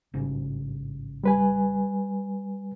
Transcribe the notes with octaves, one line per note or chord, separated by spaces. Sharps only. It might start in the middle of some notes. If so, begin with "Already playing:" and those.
A1 G#2 C#3
G3 B4 G#5